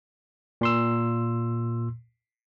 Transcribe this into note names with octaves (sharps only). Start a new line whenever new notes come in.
A#2 C6 E6